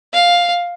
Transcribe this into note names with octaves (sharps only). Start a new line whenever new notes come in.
F5